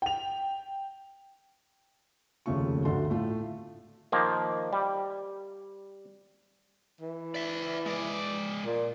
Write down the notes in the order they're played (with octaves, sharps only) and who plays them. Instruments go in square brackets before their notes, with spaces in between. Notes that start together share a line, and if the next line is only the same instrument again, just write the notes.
[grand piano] G5 F7
[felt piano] F1 D#2 C#3 A3 F4 C#6
G#1 D2 D4 F#4 A4 C6
A2 A3 F4
[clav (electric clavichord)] D#3 F3 A#3
G3
[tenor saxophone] E3
[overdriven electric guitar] D5 E5
G#3 D5
[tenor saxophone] A#2